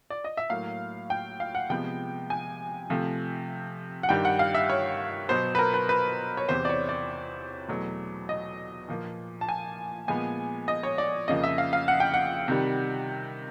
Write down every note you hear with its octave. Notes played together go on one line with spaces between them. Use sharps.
D5
D#5
E5
A2 F#3 A#3 F5
G5
F5
F#5
C3 F3 G#3 B3 G5
G#5
C3 F3 A3
F#5
G2 D#3 G3 G5
F#5
F5
E5
C#5
B2 F#3 B3 C5
B4
A#4
B4
B4
C#5
E2 C3 E3 C5
D5
C#5
D5
E2 B2 F#3 A3
D#5
A#2 F3 A#3
A5
G#5
A#2 F3 G#3 B3 G#5
D#5
C#5
D5
F2 C#3 F3 A#3 D#5
E5
F5
F5
F#5
G5
F#5
C3 D#3 G3